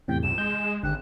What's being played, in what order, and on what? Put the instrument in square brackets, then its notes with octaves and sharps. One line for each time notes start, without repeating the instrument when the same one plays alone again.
[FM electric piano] E2 A2 C3 [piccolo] G5
[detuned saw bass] C#2 [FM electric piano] G2 C3 [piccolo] E7
[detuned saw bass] G#3 [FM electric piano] G6
[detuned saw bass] G#1 [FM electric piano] D3 G4 [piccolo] F#6